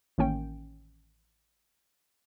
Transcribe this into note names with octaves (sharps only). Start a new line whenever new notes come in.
A1 D#3 A#3 C#4 G5